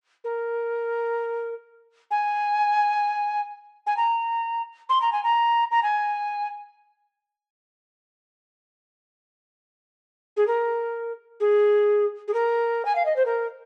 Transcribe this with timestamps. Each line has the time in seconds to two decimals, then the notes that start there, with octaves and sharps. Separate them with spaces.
0.24 A#4
2.11 G#5
3.87 G#5
3.97 A#5
4.89 C6
5.02 A#5
5.12 G#5
5.24 A#5
5.72 A#5
5.83 G#5
10.37 G#4
10.47 A#4
11.40 G#4
12.28 G#4
12.34 A#4
12.85 G#5
12.95 F5
13.06 D#5
13.16 C5
13.25 A#4